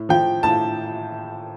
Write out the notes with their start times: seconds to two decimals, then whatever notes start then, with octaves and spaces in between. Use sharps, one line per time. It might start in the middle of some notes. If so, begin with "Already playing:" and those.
Already playing: A2
0.09 F3 G5
0.43 A2 A5